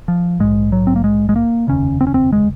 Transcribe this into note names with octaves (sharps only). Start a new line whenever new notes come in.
F3
A#1 G#2 G#3
F#3
C4
A#3
G#3
G#3
A#3
F1 D#2 C#3 C#4
C4
C#4
C4
G#3